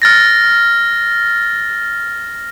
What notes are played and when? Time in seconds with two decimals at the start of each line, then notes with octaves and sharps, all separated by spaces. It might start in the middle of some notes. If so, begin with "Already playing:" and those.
0.02 F6 A6 A#6